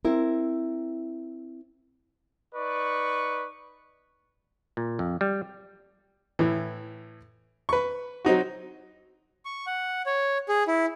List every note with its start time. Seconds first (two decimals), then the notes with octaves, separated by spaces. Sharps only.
0.05 C4 E4 A#4
2.55 D#4 B4 D5 C#6
4.77 A#2
4.99 F2
5.21 G3
6.39 A2 E3
7.69 B4 C#6
8.25 F#3 C4 D#4 F#4
9.45 C#6
9.67 F#5
10.06 C#5
10.49 G#4
10.68 E4